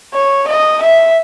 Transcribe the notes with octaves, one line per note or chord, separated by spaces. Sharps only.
C#5
D#5
E5